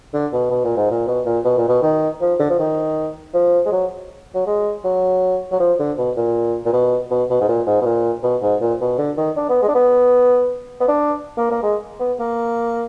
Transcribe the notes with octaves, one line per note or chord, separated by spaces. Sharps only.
D3
B2
B2
A#2
G#2
A#2
B2
A#2
B2
A#2
B2
D#3
F3
D3
F3
D#3
F3
G#3
F#3
F#3
G#3
F#3
F#3
F3
D3
B2
A#2
A#2
B2
B2
B2
G#2
A#2
G#2
B2
A#2
B2
G#2
A#2
B2
D3
D#3
D4
B3
G#3
D4
B3
B3
D4
A#3
A#3
G#3
B3
A#3